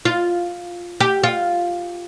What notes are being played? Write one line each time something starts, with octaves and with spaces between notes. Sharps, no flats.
F4
G4
F4